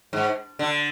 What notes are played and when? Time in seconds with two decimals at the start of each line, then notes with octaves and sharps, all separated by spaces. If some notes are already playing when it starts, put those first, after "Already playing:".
0.13 G#2
0.59 D3